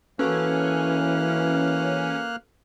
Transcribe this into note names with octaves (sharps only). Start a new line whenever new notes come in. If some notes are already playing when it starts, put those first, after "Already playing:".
E3 A#3 C#4 F#4 A4 B4 F6 F#6